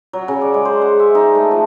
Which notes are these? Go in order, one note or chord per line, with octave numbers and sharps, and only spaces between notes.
F#3
C#3
D5
G#3
C5
F#5
E5
D#4
A3
F3